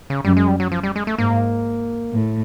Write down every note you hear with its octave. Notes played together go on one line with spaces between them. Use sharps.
C#3
F#2 G3
G#3
G3
F#3
F3
G3
G#3
A3
G#2 A#3
A2